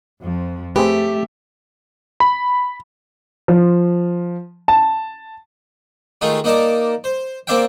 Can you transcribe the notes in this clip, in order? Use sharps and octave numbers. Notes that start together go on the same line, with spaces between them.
F2 F3
A3 C4 G4 G#4 B4 E5
B5
F3
A5
D#3 G#3 A3 D#4 F4
A#3 D#4 A#4 D5 A5
C5
A#3 C4 D5 E5 F5 G5